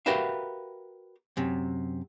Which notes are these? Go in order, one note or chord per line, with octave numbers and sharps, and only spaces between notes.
F#4 G4 A#4 B4 E5 F5
F#2 C3